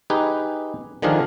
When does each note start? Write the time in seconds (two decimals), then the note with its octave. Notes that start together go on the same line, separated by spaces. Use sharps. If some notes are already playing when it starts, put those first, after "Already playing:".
0.10 D#4 G4 G#4 B4
1.02 D3 D#3 F3 D4 G#4 A#4